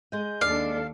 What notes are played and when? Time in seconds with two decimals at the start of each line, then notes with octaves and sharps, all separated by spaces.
0.12 G#3 D#5 G6
0.41 D#2 D4 A4 D5 F5